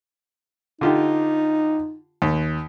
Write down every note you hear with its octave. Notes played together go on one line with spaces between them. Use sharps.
D3 D#4 F4 G4
D#2